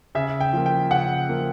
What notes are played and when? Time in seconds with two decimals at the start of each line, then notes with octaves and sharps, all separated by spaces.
0.15 C#3 E5
0.41 G5
0.53 F3 A#3
0.66 G5
0.91 C#3 F#5
1.29 F3 A#3